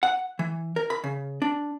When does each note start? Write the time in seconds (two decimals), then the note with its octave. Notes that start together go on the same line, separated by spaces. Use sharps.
0.03 F#5
0.39 E3
0.76 A#4
0.90 B5
1.04 C#3
1.42 D4